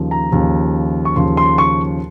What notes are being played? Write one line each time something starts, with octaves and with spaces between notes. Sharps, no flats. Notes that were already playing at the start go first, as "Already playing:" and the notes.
Already playing: D#2 C#3 F3
A#5
D#2 C#3 F3
C#6
D#2 C#3 F3 C6
C6
C#6